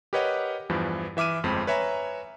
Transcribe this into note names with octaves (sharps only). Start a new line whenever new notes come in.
G4 A#4 B4 C#5 D#5 F#5
E2 G2 E3 F3
E3 E5 D6 F6 D#7
G1 F2 G#3 C4 B5
B4 C#5 E5 G#5 A#5 B5